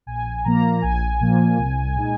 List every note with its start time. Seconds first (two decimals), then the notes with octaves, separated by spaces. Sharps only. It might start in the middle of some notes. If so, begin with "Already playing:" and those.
0.06 A#1 G#5
0.45 A#2 F3 A#3 A#5
0.82 A#1 G#5
1.20 A#2 F3 A#3
1.58 C2
1.95 A#2 G#3 D#4